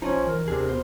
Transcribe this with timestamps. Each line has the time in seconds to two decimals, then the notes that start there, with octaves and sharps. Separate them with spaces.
0.02 A#1 F3 C#4 D#4 D#5 G#5
0.27 E3 A#4
0.48 D#2 C3 D4 G#4
0.69 B2 C5